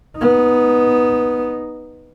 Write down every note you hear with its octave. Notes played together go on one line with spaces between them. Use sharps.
B3 D#4